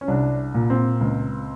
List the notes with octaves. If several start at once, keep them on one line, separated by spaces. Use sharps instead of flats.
C#4
C2 D4
A#2
C4
C#2